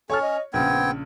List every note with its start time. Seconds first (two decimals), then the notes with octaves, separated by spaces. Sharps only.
0.10 C#4 A4 C#5 C#6 F6
0.22 D#5
0.54 A#1 C#3 B3 C4 G5 G#6